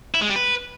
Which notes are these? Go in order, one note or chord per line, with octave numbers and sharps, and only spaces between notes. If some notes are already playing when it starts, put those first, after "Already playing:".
E4
G#3
G3
B4